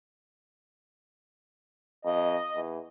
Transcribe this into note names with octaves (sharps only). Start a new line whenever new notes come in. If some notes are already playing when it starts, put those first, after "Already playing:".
F2 D#5
E2